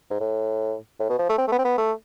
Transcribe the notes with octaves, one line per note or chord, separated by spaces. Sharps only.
G#2
A2
A2
B2
F3
A3
C4
A3
B3
C4
B3
A3